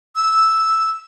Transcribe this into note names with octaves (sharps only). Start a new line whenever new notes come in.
E6